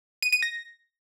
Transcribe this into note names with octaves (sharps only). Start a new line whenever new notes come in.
D#7
D#7
A#6